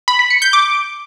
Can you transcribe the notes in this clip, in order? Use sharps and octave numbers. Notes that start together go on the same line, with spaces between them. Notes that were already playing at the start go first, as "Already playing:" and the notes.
B5
B6
C#7
G6
D6